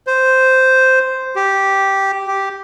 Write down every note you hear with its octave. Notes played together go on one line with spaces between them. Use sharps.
C5
G4
G4